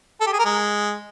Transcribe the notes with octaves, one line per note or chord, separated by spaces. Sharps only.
A4
G4
G#4
A#4
G#3